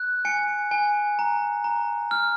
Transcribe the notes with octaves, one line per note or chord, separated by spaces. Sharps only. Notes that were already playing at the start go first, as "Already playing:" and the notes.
Already playing: F#6
G#5 C#7
G#5
A#5
A#5
F6